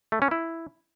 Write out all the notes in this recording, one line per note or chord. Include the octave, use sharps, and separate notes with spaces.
A3
C#4
E4